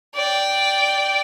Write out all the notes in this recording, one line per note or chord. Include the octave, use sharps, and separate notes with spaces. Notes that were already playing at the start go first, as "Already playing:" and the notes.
D5 G5